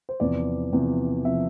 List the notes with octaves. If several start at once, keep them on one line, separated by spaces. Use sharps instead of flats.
C5
E2 C3 F3 D5
E2 C3 F3
C3 F3 E5